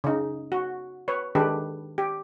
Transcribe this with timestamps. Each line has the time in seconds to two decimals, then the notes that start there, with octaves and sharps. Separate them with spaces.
0.04 C#3 D#4
0.52 F#4
1.08 B4 C#5
1.35 D#3 G#3 D4 G4 A4 B4
1.98 G4